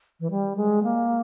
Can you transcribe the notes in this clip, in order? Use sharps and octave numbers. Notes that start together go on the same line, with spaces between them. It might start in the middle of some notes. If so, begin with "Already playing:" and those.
E3
G3
G#3
A#3